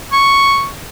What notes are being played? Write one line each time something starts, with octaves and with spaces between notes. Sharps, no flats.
C#6